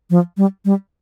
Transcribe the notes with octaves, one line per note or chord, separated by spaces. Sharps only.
F3
G3
G3